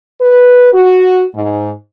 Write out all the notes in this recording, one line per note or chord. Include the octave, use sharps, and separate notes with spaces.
B4
F#4
G#2